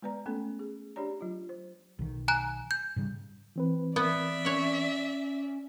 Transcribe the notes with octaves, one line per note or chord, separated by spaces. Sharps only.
G#3 B3 B4 D5 A#5
A3 B3 C#4 A4
G#4
D4 G4 C#5 D5 A#5
F#3 F4
C5
B1 D#3
G#5 A#5 F#6
G6
G#2 C#3 G3
E3 C4 B4
B3 D5 E5
C#4 C#5 F#5